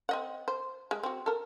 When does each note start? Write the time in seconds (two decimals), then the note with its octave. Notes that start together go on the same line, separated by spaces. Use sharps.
0.09 C4 D#5 F#5
0.48 C5
0.91 G#3
1.03 C4 F#4
1.26 A4 A#4